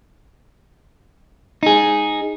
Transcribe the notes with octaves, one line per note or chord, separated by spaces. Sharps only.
D#4 G#4